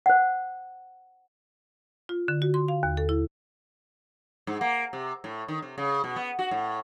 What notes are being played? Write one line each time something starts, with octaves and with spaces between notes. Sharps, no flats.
C5 F#5
F4
D3
F#4
C6
F5
D#2
A4
E4
G#2
A#3
C3
A2
D#3
C3
C#3
B2
B3
F#4
A2